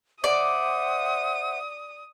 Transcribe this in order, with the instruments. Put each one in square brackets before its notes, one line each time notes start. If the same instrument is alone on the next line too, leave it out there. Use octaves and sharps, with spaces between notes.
[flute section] C5 E5 F#5 [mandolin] D5 [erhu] D#6